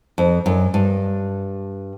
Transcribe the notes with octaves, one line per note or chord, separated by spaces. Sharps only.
F2
F#2
G2